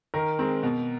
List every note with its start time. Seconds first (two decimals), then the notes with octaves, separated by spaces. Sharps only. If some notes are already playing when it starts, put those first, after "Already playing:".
0.14 D#3 A#4
0.39 G#3 C4
0.63 B2